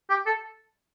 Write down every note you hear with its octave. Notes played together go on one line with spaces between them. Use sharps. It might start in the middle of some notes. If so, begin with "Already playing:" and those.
G4
A4